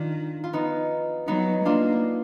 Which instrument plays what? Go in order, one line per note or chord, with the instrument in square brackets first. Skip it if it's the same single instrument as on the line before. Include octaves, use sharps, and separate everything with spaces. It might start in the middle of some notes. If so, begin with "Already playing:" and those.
Already playing: [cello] D#3 [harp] D4 F4
[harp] F4
B3 D#4
[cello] F#3 [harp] B3 D#4
[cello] A#3 [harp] D4 F4